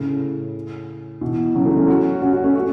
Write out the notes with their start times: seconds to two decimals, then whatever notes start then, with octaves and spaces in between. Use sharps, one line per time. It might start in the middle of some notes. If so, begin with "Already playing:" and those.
Already playing: A2 C#3
1.21 B2 E3
1.55 C#3 F#3
1.66 E3 A3
1.77 A3 C#4
1.88 C#4 F#4
2.22 C#4 F#4
2.33 C#4 F#4
2.44 A3 C#4
2.55 C#4 F#4